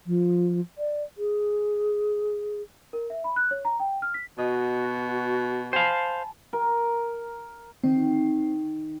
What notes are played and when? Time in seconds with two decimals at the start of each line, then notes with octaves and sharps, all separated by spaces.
0.06 F3
0.78 D5
1.18 G#4
2.93 A#4
3.10 E5
3.24 B5
3.36 F#6
3.51 C#5
3.65 A#5
3.80 G5
4.02 F6
4.14 B6
4.38 B2 F#4 D#5
5.73 C5 F5 G#5 A5 B5
6.53 A#4
7.84 D#3 C4